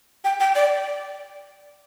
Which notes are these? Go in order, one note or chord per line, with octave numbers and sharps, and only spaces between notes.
G5
G5
D5